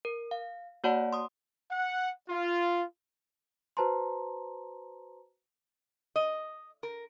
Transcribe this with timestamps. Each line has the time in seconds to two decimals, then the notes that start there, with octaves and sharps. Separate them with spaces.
0.05 A#4
0.31 F5
0.84 A#3 F#4 C#5 D5 F#5 A5
1.13 C6 D#6
1.71 F#5
2.29 F4
3.77 F#4 B4 C5 A5 A#5 C6
6.16 D#5
6.83 A#4